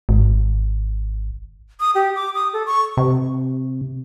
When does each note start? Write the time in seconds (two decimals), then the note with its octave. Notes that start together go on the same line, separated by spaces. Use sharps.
0.09 G#1
1.80 D#6
1.95 G4
2.16 D6
2.35 D#6
2.53 A4
2.66 C#6
2.97 C3